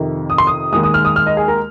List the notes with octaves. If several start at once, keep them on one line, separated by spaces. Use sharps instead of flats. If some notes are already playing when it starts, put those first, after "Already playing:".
Already playing: F2 C3 D#3
D#6
C6
D#6
D#2 D#3 G#3 D#6
D#6
F6
D#6
F6
D#5
G#4
A#4